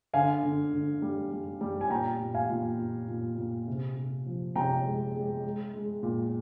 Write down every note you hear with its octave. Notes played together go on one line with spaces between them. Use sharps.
D3 F5 G#5
D3
D3
G3
G3
G3
G#5
A#2 G5 A#5
A#2
F5 G#5
A#2
A#2
A#2
A#2
C3
C3
F3
C3 G5 A#5
G#3
G#3
G#3
G#3
A#2